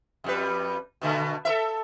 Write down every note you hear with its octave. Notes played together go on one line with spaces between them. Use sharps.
F2 G3 B4
B2 D3 A3
A4 A#4 E5